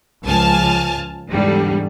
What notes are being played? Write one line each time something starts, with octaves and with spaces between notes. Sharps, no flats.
C#2 F3 G#5 A5 F6
E2 G#2 D3 G3